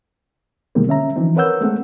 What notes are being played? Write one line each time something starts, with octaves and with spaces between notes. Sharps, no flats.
B2 D#3 G3 G#3 A#3 C4
D3 C#4 E5 A#5
E3 F3 C4 D#4
A#4 B4 C#5 F#5 E6 G6
G#3 A3 C4 F#5